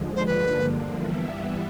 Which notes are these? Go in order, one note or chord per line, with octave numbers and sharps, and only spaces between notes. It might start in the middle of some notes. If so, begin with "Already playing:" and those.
Already playing: D#2 D3 F3 G#3
C5
G2 D3 F3 A#3 D4 B4
G2 E3 G3 B3 E4